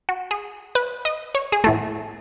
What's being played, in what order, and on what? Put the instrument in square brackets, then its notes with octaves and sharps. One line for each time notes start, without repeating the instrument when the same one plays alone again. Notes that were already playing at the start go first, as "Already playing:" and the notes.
[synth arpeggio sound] F#4
G#4
B4
D#5
C#5
G#4
A2 E3 A3 A4